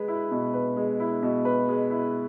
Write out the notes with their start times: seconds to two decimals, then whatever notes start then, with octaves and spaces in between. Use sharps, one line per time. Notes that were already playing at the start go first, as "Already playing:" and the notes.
Already playing: G#3 B4
0.08 E4
0.31 B2
0.54 B4
0.77 G#3
1.00 E4
1.22 B2
1.45 B4
1.68 G#3
1.91 E4